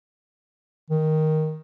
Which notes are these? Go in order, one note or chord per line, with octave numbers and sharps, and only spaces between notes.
D#3